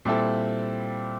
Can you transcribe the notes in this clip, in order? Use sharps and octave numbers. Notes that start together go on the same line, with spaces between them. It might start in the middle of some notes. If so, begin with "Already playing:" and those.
A#2 G3 C4 E4 A4